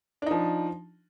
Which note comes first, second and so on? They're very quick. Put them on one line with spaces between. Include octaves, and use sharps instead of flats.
D4 D#4 F3